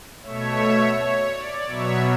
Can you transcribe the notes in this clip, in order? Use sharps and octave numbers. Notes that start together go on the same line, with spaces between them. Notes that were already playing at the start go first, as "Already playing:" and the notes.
B2 A3 C#5 E5
C#5
D5
B2 F#3 B3 C#5 E5